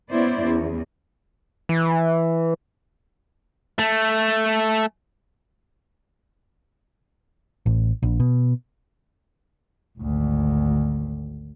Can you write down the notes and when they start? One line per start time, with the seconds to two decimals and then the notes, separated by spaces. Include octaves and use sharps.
0.10 B3 C#4 E4 C5 D5
0.43 E2
1.69 E3
3.79 A3
7.66 A1
8.03 A#1
8.20 B2
9.99 G#1 D2